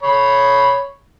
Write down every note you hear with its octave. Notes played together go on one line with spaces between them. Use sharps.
C#5 B5